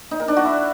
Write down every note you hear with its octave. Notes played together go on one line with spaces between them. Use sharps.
D#4
A#4
D4
F#4
E4